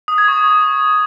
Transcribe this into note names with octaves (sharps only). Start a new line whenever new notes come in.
D#6
G#6
C#6